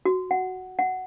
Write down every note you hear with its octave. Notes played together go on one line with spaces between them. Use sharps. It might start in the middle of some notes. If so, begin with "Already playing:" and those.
F#4
F#5
F#5